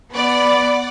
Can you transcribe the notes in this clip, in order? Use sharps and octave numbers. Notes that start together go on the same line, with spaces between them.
B3 D5 F#5 B5